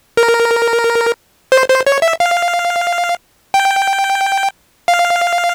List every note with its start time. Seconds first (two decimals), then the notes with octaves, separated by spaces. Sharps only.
0.17 A#4
1.52 C5
1.69 C5
1.87 C#5
2.02 E5
2.20 F5
3.54 G5
4.88 F5